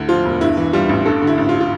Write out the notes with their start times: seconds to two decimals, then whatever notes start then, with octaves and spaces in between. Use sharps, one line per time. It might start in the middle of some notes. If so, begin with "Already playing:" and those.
Already playing: D2 D3 E4
0.09 F3 F4
0.25 E1
0.41 G2 E4
0.57 E3
0.73 G3 F4
0.89 A1
1.05 G2 A4
1.22 D3
1.27 E4
1.38 A1
1.49 F4
1.60 F4